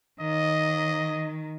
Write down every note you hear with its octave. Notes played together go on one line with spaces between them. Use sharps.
D#3 D#5